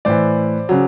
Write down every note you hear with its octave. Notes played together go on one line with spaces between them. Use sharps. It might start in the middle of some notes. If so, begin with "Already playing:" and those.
A2 E3 C5 D5
C#3 F#3